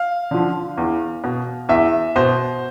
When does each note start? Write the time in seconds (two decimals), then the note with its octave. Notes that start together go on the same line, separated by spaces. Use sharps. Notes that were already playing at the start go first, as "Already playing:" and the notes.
Already playing: F5
0.31 D3 F3
0.77 E2
1.24 B2
1.69 E2 E5
2.16 B2 C5